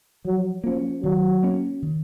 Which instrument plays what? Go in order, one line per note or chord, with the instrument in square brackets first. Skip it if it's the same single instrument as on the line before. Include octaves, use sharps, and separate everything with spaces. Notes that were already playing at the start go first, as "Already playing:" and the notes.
[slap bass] F3 [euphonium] F#3
[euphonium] F3 [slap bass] A#3 C#4
[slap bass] D#3 [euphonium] F#3
[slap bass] A#3 C#4
D#3